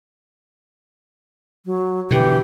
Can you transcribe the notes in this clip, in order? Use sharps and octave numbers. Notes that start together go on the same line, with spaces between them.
F#3
B2 D3 E3 G4